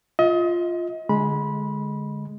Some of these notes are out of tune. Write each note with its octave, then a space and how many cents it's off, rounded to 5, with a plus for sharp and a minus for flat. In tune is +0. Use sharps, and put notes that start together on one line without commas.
F4 +0 D#5 +35
D3 +0 G#3 +0 B5 -20